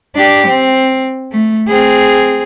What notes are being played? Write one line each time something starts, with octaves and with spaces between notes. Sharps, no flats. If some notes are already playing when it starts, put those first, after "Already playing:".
D4 G4
C4
A3
C4 G#4